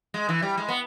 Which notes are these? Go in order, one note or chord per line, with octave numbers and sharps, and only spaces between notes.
G#3
E3
G3
G#3
B3